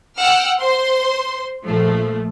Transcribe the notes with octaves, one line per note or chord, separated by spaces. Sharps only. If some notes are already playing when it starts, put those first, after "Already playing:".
F#5 G5 E6 F6
C5 C6
A#1 F3 A3